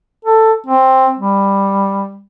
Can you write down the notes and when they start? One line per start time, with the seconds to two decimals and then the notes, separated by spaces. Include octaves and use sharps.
0.25 A4
0.67 C4
1.18 G3